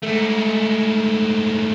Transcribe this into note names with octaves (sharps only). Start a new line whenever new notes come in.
G#2 A3